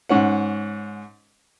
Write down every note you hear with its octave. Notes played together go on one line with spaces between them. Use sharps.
G#2 C#4 F#5